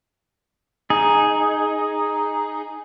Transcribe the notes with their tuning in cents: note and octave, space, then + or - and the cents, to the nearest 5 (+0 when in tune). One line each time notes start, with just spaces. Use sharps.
D#4 +0 G#4 +0